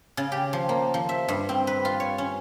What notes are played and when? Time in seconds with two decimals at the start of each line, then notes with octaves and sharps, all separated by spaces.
0.17 C#3
0.32 G4
0.53 F3
0.69 A#3
0.94 F3
1.09 E5
1.28 G2
1.49 C4
1.67 B4
1.85 F4
2.00 C#5
2.18 C#4